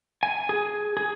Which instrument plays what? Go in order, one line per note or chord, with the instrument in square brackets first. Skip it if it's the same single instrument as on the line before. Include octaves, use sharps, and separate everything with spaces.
[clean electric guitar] G#5
G#4
G#4